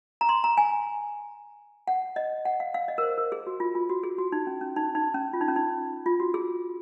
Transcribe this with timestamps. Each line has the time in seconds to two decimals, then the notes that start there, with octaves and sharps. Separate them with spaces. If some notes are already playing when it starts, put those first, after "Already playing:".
0.21 A#5
0.29 C6
0.44 A#5
0.57 G#5
1.88 F#5
2.16 D#5
2.45 F#5
2.60 F5
2.74 F5
2.88 D#5
2.98 A#4
3.02 C5
3.18 A#4
3.32 G#4
3.47 F#4
3.60 F4
3.75 F4
3.89 F#4
4.03 G#4
4.18 F#4
4.32 D#4
4.47 C#4
4.61 C#4
4.76 D#4
4.95 D#4
5.14 C#4
5.33 F4
5.41 D#4
5.48 C#4
5.56 D#4
6.06 F4
6.20 F#4
6.34 G#4